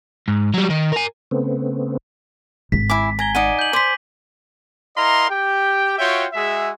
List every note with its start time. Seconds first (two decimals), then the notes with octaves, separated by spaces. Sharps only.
0.28 G#2
0.54 F#3 G3
0.70 D#3
0.93 A#4 G#5
1.31 C#3 A3 B3 C4
2.72 G#1 B6
2.90 E4 G#5 D6 B6
3.19 G#5 A#5 G#6 G7
3.35 D#4 D5 F#5 D7 D#7
3.59 G6 F#7
3.73 C5 C6 D6 G6 B6
4.97 E4 A#4 D#5 F5 A#5 C6
5.30 G4 G5
5.99 F4 F#4 C#5 E5 G5
6.33 G#3 F#4 G#4 E5